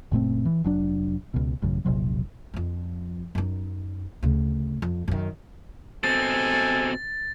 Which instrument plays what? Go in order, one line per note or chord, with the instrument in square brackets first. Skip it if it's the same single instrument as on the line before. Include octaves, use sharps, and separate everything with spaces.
[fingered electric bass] F#1 A#2 A3 C4
E3
F1 F#3 D4
C#2 B2
A1 F#2 C#3
E1 A#1 C3 F#3
[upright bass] F2 F3
F#2 D#4
D2 C#3
F2
F#2 D#3
[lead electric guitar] B2 C4 [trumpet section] G#3 A4 G#5 [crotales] A6